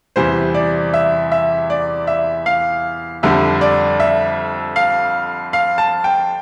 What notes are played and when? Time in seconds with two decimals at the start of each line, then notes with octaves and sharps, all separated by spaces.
0.16 E2 C3 E3 G3 C5
0.54 D5
0.94 E5
1.32 E5
1.70 D5
2.07 E5
2.46 F5
3.23 F2 D3 G3 E5
3.61 D5
4.00 E5
4.76 F5
5.53 F5
5.78 A5
6.04 G5